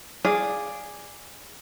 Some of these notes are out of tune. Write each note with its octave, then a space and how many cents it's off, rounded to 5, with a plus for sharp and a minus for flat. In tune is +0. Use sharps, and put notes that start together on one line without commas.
G#4 -10 D5 +0 F5 +0